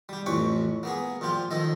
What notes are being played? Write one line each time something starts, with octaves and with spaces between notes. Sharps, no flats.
G3 G4
A1 F2 B4 C#5 C#6 D6
A#3 B3 G#4
A#2 F3 F4 G4
D#3 F3 A4 D#5